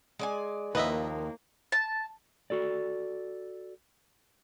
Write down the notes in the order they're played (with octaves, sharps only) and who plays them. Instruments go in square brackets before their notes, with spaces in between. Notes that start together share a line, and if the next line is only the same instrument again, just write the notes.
[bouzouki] G#3 D5 G#5
[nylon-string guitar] D#2 [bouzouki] F3 [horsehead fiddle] A#3 [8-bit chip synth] B4 D#5 E5
[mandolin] A5
[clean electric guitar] F#4 A4 D5